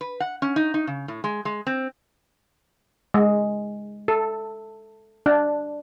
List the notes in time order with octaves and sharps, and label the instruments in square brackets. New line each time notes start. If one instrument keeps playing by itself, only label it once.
[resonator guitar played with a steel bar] B4
F#5
C#4
D#4
D#4
C#3
A2
G#3
G#3
C4
[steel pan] G#3
A4
D4